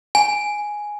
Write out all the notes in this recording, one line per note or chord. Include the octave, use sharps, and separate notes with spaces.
G#5